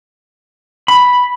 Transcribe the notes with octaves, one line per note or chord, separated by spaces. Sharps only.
B5